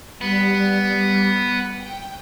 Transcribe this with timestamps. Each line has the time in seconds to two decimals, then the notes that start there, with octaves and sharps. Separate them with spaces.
0.21 G3 B3
1.78 G5